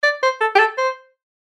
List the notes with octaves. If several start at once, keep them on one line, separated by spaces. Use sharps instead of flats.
D5
C5
A4
G4
A4
C5